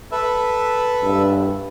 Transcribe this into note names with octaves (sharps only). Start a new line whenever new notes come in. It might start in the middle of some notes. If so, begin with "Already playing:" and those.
A4 B4 E5
G2